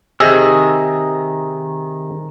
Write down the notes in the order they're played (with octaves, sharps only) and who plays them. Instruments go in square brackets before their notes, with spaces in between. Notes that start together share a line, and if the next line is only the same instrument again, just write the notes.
[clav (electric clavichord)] C3 G#4 D#5 [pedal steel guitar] D#3 E6